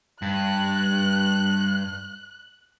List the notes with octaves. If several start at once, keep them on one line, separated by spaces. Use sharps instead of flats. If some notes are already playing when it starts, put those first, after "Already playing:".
G2 F#6